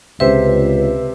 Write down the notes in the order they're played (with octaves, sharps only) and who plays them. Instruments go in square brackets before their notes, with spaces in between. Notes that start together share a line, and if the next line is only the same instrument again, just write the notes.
[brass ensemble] C#2 [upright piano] C3 C5 E5 [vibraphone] B4